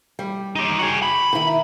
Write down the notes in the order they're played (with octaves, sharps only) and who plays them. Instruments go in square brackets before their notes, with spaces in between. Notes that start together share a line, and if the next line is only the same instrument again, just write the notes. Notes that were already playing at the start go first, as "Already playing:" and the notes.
[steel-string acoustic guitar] G3
[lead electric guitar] D#4 G4
F#4 G#4
B5
[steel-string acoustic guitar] D#3 E4